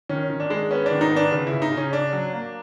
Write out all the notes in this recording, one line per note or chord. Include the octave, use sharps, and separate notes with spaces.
D#3 C#4
D#3
D4
G#3
B3 C#4
D4
D#3
D#4
B3
D4
C#3
C#3 E4
D#4
C#3
C#4
C#3 D4
F#3
A#3